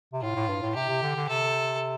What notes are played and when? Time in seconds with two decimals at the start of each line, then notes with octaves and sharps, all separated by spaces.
0.13 C3
0.22 A2 F4
0.35 A2
0.49 G2
0.62 A2
0.75 C3 G4
0.89 C3
1.02 D3
1.16 D3
1.29 C3 A4